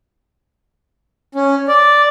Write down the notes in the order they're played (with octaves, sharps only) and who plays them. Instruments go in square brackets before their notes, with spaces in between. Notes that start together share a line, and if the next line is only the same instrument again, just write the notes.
[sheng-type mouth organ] C#4
D5